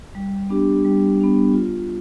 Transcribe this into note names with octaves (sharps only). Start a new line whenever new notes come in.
G3
B3 D4 G4
G3
B3 D4 G4
F4